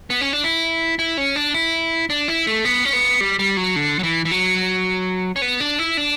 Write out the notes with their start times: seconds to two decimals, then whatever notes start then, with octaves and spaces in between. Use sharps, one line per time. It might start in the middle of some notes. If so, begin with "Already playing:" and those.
0.10 B3
0.21 C#4
0.33 D4
0.44 E4
0.99 E4
1.17 C#4
1.36 D4
1.54 E4
2.10 D4
2.28 E4
2.47 A3
2.65 B3
2.85 C#4
2.93 B3
3.21 G3
3.39 G3
3.57 F#3
3.76 D3
3.99 F#3
4.03 E3
4.25 E3
4.31 F#3
5.36 C#4
5.42 B3
5.60 D4
5.79 E4
5.97 D4